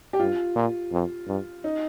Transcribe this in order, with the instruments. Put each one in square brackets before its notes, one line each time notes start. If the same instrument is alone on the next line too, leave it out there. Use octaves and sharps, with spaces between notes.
[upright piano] G4
[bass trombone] G2 [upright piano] F4
[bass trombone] A#2
F2
G2
[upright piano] D#4